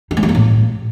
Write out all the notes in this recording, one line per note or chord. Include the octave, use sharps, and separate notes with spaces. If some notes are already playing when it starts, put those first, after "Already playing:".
D#4
A3
G#3
A#3
A2